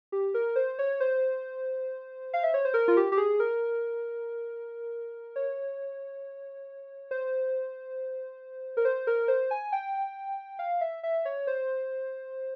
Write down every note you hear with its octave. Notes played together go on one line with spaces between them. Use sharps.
G4
A#4
C5
C#5
C5
F5
E5
C#5
C5
A#4
F4
G4
G4
G#4
A#4
C#5
C5
A#4
C5
A#4
C5
G#5
G5
F5
E5
E5
C#5
C5